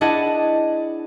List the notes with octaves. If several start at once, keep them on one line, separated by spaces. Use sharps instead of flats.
D4 E4 G#4 D#5 F#5 A5